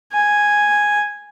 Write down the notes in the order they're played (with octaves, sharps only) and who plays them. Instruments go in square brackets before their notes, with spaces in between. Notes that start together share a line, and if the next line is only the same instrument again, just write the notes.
[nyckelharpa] G#5